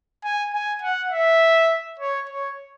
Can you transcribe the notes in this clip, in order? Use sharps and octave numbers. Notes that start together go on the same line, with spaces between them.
G#5
G#5
F#5
E5
C#5
C#5